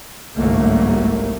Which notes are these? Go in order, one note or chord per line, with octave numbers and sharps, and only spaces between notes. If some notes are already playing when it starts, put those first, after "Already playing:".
G1 C2 G#2 F#3 A3 A#3